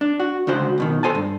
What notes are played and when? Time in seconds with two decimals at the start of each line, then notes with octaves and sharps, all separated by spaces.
0.01 D4
0.20 F#4
0.47 C#2 D3 F#4 C5
0.78 B1 B2 D#3
1.03 A4 C5 G#5 A5
1.15 G2